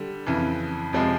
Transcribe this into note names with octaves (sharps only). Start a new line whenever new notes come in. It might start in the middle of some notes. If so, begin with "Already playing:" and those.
Already playing: D3 G3
F2 C#3 E3
F2 C3 F3 G#3